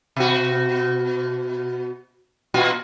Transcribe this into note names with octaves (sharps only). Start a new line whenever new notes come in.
B2 F#4
A#2 F4 F#4